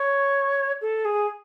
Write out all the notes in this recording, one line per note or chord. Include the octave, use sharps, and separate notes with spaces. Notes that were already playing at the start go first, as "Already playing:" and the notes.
Already playing: C#5
A4
G#4